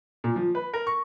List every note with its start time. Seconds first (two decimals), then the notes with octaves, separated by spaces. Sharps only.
0.24 A#2
0.36 F3
0.55 B4
0.74 A#4
0.87 C#6